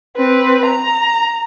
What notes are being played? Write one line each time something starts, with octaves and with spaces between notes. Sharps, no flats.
C4 B4
A#5